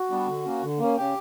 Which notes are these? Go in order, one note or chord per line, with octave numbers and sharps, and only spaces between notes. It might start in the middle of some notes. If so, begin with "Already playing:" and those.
Already playing: F#4
G3 B3 D4
D3
A#3 C#4
D3
A#3 C#4
C#3 G4